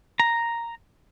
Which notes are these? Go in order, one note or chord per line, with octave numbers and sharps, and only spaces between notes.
A#5